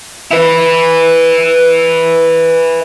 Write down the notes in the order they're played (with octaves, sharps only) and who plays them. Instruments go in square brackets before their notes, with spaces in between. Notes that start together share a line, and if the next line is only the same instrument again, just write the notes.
[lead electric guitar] E4 B4